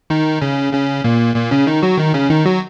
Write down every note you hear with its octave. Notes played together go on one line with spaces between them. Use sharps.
D#3 D#4
C#3 C#4
C#3 C#4
A#2 A#3
A#2 A#3
C#3 C#4
D#3 D#4
F#3 F#4
D#3 D#4
C#3 C#4
D#3 D#4
F#3 F#4